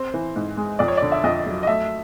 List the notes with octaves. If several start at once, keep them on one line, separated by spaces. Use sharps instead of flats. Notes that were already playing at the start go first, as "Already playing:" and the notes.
Already playing: C4 C5
E3
G#2
G#3
F2 D5
C#5
D3 D5
E5
F2 D#5
F#3
D#5
A3 E5